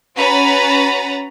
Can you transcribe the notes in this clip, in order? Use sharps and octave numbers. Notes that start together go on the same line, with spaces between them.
C#4 F#4 B4 A#5 B5 A6